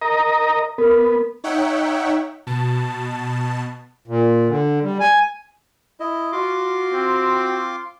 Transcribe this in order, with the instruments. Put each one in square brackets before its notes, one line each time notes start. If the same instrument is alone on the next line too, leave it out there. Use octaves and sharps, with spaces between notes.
[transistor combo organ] A#4 D#5 A#5
[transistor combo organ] B3 [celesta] A#4
[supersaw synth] D#4 C#5 E5 F#5 G5
B2 A5
[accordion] A#2
D3
G3
G#5
[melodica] E4 D#5
[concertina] F4 C6 D6 [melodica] F#4
[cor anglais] C4